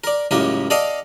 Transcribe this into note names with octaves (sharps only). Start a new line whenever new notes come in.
A#4 D5
C#2 F#2 A2 A#3 G4 A#4
A4 D5 D#5 F5 G5